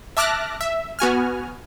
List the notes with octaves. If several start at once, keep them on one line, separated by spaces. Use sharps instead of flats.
E5 A5 D6 F6 F#6 A#6
E5
B3 F#4 G#5 F6